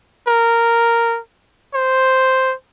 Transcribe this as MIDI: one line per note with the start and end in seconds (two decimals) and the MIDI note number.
0.27 1.19 70
1.74 2.54 72